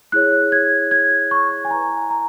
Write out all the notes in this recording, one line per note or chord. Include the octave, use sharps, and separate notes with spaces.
E4 G#4 C#5 F#6
G#6
G#6
C#6
G#5
E4 B4 A#5
A#5